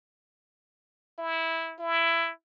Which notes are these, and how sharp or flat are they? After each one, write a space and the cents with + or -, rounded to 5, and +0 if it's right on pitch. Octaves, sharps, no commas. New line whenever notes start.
E4 -10
E4 +15